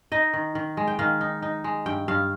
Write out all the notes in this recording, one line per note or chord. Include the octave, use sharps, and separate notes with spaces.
D#4 D#5
D#3
D#3
G#3
G5
D#3 F5
D#4
D#4
G#3
G2 G5
G2 F5